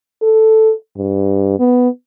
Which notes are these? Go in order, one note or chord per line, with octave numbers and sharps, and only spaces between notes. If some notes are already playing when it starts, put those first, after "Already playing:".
A4
G2
B3